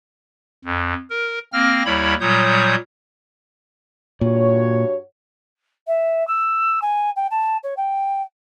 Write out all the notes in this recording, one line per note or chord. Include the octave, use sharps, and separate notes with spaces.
F2
A#4
A#3 C4 F6 A#6
D#2 G3 E4 C#5 B5
A#2 F#3 G3 C#5 D#6 G6
G2 A#2 F#4 C#5
E5
E6
G#5
G5
A5
C#5
G5